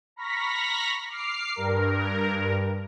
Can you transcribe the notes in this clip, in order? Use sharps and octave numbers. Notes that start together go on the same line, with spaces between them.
A#5 B5 C#6 F6 A#6 B6
D6 F6 C7
G2 A#4